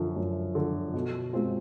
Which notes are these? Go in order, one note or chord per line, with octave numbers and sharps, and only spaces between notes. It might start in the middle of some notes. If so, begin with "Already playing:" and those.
Already playing: F#2 D3 F3
F#2
D3 F3
B2
G#3 C4 F4